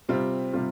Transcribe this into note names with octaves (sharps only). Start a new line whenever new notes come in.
C3 G3 C4 F4
C3 G3 C4 F4